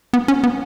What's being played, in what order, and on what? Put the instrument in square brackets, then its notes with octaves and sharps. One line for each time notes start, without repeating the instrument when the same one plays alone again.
[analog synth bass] B3
C#4
B3